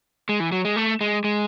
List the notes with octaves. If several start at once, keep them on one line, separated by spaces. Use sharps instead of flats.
G#3
E3
F#3
G#3
A3
G#3
G#3